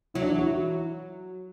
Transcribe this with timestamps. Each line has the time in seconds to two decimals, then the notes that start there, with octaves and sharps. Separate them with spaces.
0.14 F#3 E4
0.22 D4
0.30 E3 E4
0.38 F#4
0.46 E3 E4